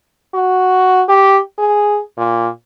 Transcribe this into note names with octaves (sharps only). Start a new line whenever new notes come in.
F#4
G4
G#4
A#2